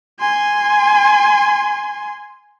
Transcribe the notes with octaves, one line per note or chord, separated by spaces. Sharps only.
G#5 C6